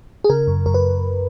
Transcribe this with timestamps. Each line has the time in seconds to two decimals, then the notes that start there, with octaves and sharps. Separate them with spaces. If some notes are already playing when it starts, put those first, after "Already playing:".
0.24 G#4
0.30 C#3 A#4
0.47 F#2
0.66 F#2 A#4
0.74 B4